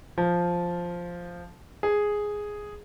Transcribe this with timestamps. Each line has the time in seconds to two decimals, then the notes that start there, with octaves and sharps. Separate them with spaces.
0.18 F3
1.83 G#4